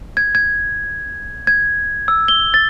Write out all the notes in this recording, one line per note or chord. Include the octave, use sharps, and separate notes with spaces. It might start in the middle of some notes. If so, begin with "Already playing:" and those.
G#6
G#6
G#6
E6
G7
A6